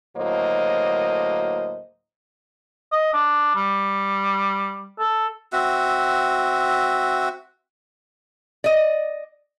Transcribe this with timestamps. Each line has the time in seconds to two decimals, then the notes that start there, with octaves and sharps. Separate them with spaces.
0.17 D2 A2 F#3 A#3 C5 D#5
2.92 D#5
3.13 D4
3.56 G3
4.99 A4
5.53 C4 F#4 E5
8.64 D5 D#5